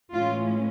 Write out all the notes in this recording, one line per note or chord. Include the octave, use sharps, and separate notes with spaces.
A2 E3 G#3 C#4 F4